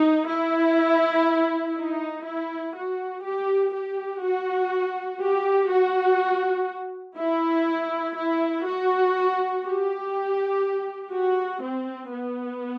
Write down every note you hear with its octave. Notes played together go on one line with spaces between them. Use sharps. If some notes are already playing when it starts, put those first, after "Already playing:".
Already playing: D#4
E4
D#4
E4
F#4
G4
G4
F#4
G4
F#4
E4
E4
F#4
G4
F#4
C4
B3